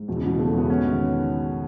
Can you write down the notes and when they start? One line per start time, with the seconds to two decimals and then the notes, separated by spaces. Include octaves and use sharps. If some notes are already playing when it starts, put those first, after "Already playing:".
Already playing: G#2
0.08 E2 B2
0.17 C#3
0.23 B2 E3
0.39 C#3 A3
0.53 E2 B3
0.69 G#1 C#4
0.85 D#3